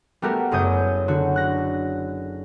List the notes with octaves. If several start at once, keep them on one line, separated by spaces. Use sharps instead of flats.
G3 A3 B3 F#4 G4 A#4
F#1 F#2 C#5 D#6 G6
D3 F#4
F#6 A#6